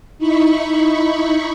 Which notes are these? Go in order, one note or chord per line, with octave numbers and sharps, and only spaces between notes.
D#4 E4 B5 C#6